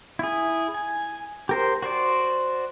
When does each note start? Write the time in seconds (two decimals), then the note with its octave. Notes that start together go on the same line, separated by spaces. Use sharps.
0.19 E4 G#4
0.74 G#5
1.49 G4 A#4 C5
1.82 F#4 C5 D5